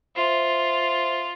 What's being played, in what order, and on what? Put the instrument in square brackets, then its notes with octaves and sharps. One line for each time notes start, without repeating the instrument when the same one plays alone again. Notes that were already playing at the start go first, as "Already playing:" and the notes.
[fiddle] F4 [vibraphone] C5 E5